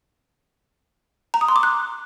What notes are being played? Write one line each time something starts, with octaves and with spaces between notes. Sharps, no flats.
A#5
D#6
C6
D6
F#6